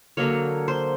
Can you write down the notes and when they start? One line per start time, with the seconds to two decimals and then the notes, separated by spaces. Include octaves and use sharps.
0.17 D3 F#3 A#3 C#5
0.68 C5